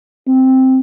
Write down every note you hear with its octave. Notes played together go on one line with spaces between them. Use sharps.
C4